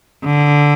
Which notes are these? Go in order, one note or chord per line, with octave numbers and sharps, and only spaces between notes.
D3